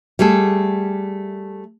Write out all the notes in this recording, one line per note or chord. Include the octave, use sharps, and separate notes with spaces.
G3 A3 G#4 A4